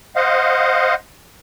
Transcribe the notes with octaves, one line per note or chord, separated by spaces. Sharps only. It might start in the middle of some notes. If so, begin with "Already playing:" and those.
C5 D#5 F5 F#5